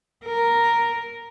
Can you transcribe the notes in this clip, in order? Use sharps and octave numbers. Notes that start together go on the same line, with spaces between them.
A#4